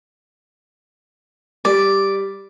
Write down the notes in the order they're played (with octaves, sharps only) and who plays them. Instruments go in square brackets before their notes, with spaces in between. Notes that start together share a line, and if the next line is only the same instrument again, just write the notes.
[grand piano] G3 [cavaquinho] D5